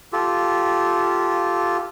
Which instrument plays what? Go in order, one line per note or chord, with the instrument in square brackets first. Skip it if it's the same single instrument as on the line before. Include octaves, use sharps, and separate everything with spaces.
[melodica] F4 G4 A4